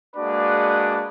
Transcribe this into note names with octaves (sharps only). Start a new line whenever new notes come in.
G#3 A#3 D4 F#4 B4 D5